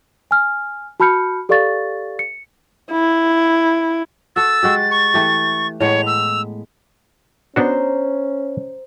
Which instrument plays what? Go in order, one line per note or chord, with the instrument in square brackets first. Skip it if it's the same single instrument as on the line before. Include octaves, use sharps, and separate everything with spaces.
[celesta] G#5 F6
F#4 A5 B5 F6 G6 C#7
G4 A4 D5 F5 C#6 A6
C#7
[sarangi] E4
[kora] F#4 A4 [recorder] E6 [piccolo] A6
[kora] G#3 F#4 G4
[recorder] C#6
[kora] E3 A3 G4
[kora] A2 G#3 B3 [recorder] C#5 [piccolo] F7
[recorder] E6
[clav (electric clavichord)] B3 D4 F#4 [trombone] C#4 [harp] C5 A#5